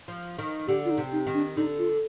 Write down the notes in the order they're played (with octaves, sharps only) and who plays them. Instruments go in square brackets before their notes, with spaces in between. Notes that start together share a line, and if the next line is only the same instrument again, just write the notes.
[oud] F3
D#3
[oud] D3 [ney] G4
[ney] F4
D#4
[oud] C3
[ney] D#4
[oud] D#3
[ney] D4
[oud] D3 [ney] D#4
[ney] F4